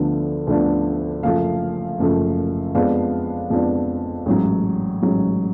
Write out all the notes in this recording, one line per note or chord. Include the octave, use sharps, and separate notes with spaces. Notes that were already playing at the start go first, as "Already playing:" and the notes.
Already playing: D2 D3 F3 B3 D4
D2 D3 F3 B3 D4
F#1 F#2 F3 A3 F5
F#1 F#2 F3 A3
F2 F3 G#3 B3 D4 F5
F2 F3 G#3 B3 D4
A1 G#2 F#3 C#5
A1 G#2 F#3